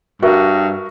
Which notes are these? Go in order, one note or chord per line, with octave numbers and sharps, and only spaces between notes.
G2 F#4 A#4 E5